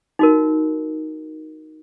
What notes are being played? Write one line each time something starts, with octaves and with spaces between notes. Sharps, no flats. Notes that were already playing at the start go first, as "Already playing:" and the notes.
D#4 F#4 A#4